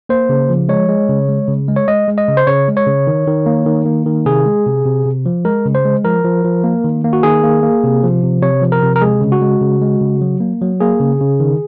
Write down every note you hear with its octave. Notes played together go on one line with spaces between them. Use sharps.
A#3 C5
C#3
F3
G#3 C#5
G#3
C#3
G#3
C#3
G#3
C#5
G#3 D#5
G#3
D#5
C#3
C5
C#3 C#5
G#3
C#5
C#3
D#3
D#3
A#3
D#3
A#3
D#3
C3 G#4
G#3
C3
C3
C3
F3
G#3 A#4
C#3
C5
G#3
F3 A#4
F3
F3
A#3
D#3
A#3
F#4
D#3 G#4
A#3
A#3
C3
F3
C3
C3 C#5
F3
A#4
C3
A#4
G#3 G#4
C#3
F#4
G#3
C#3
G#3
C#3
F#3
A#3
F#3
A#3 G#4
C#3
C#3
D#3